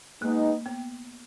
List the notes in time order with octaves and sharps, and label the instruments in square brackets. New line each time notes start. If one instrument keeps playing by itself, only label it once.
[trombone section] G#3 B3 D#4 [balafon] A#3
[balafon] B3